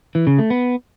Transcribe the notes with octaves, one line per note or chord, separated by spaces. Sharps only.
E3
C#3
A3
B3